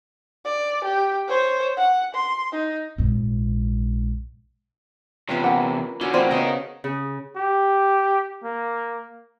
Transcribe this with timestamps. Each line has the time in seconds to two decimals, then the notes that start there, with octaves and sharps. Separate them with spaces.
0.45 D5
0.84 G4
1.27 C5 C#5
1.77 F#5
2.14 C6
2.52 D#4
2.98 A#1 G#2
5.29 E2 C3 C#4 F4 B4
5.44 A#3 F#5 G5
6.01 D3 C#4 F#4
6.13 A2 E3 A#3 C4 F4 D5 G#5 A5
6.31 C#3 B3 A#4 D#5
6.84 C#3
7.36 G4
8.43 A#3